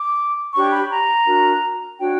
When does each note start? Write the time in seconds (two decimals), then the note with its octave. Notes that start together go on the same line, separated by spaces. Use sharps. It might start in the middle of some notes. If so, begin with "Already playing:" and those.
Already playing: D6
0.52 D4 G4 C#5 C#6
0.71 B5
0.90 A#5
1.25 D4 F#4 A#4
1.98 D4 F#4 C#5 G5